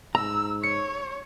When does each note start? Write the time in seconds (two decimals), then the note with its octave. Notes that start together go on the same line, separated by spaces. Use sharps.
0.15 G#2 A#5 E6
0.63 C#5 C#7